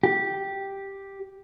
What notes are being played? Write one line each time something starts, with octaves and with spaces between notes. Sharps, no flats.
G4